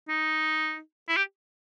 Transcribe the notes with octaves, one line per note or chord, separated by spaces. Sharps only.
D#4
E4
G4